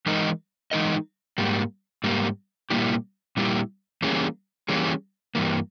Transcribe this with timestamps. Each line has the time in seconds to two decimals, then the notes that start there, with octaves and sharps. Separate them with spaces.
0.06 E3 G#3 D#4 A#4 D#5
0.71 E3 G#3 D#4 A#4 D#5
1.38 G#2 G3 A#3
2.04 G#2 G3 A#3
2.70 A#2 G3 A#3 E4 G4
3.37 A#2 G3 A#3 E4 G4
4.02 E3 G3 A#3 C#4 G#4
4.69 E3 G3 A#3 C#4 G#4
5.35 G2 E3 A#3